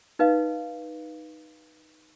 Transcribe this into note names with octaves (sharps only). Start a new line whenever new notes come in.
D#4 B4 D#5 F5